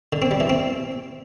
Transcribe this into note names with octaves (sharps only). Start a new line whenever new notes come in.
D3
C4
G3
E3
C4